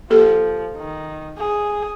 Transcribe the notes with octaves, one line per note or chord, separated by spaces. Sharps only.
F3 A#3 G4 A4
D#3
G#4